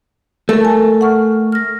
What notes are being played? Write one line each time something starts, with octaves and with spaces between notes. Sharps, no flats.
A3 A4 A#4
G#5 A5
F#5 C#6 F6
F6 A#6